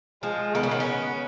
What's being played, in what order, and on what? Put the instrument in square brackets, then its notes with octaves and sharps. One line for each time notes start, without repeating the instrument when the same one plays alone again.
[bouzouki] F3 [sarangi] G#3
[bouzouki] D#3 [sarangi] B3
[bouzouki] C#3
D#3
C#4